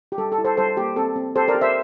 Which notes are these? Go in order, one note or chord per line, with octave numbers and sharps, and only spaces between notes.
G4
G3 A4
A4
E4
A4 C5
G3 A4 C5
A#3 G4
C4 A4
C4
G4 A4 C5
A#4 D5
G4
C5 E5